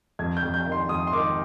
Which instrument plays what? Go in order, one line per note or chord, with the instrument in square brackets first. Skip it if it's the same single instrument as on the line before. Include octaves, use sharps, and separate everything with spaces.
[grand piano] F2 G#6
G6
F2
G6
D#3
C6
F2 D#6
C6
D#3 D6